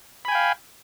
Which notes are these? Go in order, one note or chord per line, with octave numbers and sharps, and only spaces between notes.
F5 G5 G#5 B5